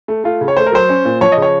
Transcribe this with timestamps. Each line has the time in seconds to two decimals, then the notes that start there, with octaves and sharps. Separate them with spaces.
0.08 A3
0.24 A3 F4
0.41 C#3
0.48 C#5
0.57 A3 C5
0.66 A#4
0.72 F#3 C5
0.89 C#4
1.05 A#2
1.21 F3 C#5
1.32 C#3 D#5
1.42 C#5